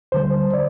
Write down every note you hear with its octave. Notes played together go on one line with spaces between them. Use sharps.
D2 D3 G3 C5
D5